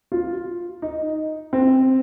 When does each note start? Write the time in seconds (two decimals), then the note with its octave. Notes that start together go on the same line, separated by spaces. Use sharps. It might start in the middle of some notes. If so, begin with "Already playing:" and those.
0.12 F4
0.82 D#4
1.53 C4